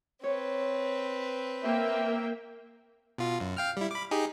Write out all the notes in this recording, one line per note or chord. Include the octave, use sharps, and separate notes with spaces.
C4 B4 C#5
A#3 E5 G5
B2 F4
F#2
F5 G5 F6
G3 E4
B5 D6
D#4 G4 G#4